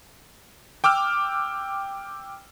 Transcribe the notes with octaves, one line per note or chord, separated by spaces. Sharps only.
G5 D6 E6 F6